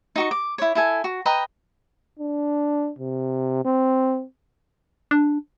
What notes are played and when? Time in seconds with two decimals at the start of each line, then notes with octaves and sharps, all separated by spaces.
0.16 D#4 F#4 C#6
0.31 D6
0.58 E4 C#5
0.75 E4 A4 G#5
1.04 F#4
1.26 B4 D#5 G5 A#5
2.19 D4
2.99 C3
3.65 C4
5.11 D4